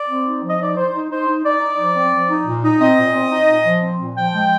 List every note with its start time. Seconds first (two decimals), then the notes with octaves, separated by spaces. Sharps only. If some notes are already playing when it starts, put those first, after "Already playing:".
Already playing: D5
0.09 C4
0.25 D#4
0.42 F3
0.49 D#5
0.59 D#4 D5
0.77 D#4 C5
0.93 D#4
1.10 D#4 C5
1.27 D#4
1.44 D#4 D5
1.61 D#4
1.79 F3
1.95 C4
2.12 F3
2.30 D#4
2.46 A#2
2.63 D#4
2.80 C4 D#5
2.98 A#2
3.14 C4
3.31 D#4
3.48 A#2
3.65 F3
3.82 C4
3.99 A#2
4.16 F3 G5
4.33 G#3